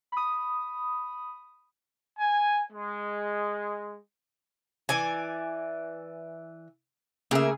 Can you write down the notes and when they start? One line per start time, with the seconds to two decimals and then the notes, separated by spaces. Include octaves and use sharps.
0.12 B5 D#6
2.19 G#5
2.72 G#3
4.89 E3 D5 G#5
7.31 C#3 A3 A#3 G#4 E5